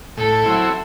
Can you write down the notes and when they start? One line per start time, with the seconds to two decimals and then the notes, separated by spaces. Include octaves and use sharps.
0.17 A2 A4
0.43 F#3 C4 E4